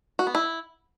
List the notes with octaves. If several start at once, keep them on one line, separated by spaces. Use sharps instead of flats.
F#4
B3
E4